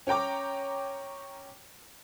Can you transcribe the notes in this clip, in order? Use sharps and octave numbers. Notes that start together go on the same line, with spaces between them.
C#4 C#5 G5 A#5 D6